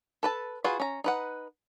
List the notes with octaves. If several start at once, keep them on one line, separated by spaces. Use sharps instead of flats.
A4 B4 A5
F4 F#4 G#4 B4
C#4 A#5
D#4 B4 F#5